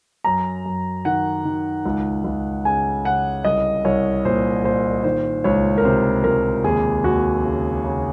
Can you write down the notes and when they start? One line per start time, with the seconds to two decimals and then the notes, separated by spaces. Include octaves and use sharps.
0.24 F#2 A#5
0.66 F#2
1.05 D#3 F#5
1.45 D#3
1.85 C#2
2.24 C#2
2.65 C#3 G#5
3.05 C#3 F#5
3.45 C2 D#5
3.85 C2 C#5
4.25 A#2 C5
4.64 A#2 C5
5.04 D#3 C5
5.44 C#2 C#5
5.78 A#4
5.85 C3 C5
6.24 C#2 A#4
6.64 D#2 G#4
7.04 D#2 F#4
7.45 C#3
7.84 C#3